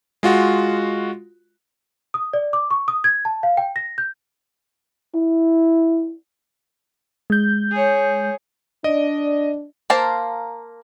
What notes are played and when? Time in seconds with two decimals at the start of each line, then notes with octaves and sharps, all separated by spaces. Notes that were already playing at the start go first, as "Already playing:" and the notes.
0.23 G#3 F4 F#4
2.14 D#6
2.33 D5
2.53 D6
2.71 C#6
2.88 D#6
3.04 G#6
3.25 A5
3.43 F5
3.57 G5
3.76 A#6
3.98 G6
5.15 E4
7.30 G#3 G6
7.72 G#4 C#5
8.84 D4 D5 D#5
9.90 A#3 A#4 C5 F5 A5